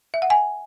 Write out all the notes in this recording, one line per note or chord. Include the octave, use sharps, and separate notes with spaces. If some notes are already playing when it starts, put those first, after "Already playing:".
E5
F#5
G#5